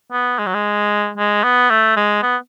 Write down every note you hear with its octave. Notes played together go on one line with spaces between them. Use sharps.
B3
G#3
F#3
G#3
G#3
B3
A3
G#3
B3